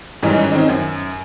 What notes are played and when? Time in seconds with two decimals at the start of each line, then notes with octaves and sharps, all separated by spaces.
0.23 G#2 D#3 E3 G3 C#4 D#4
0.51 D#3 C4 C#4 D#4
0.69 F#2